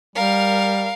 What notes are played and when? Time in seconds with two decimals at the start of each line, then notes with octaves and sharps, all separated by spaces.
0.16 G3 A#4 F5